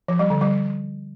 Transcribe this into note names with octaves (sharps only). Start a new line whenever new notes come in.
F3
G3
D3
G3